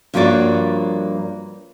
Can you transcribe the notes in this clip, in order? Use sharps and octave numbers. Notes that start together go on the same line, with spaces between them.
G2 F3 A#3 F#4 C#5 D5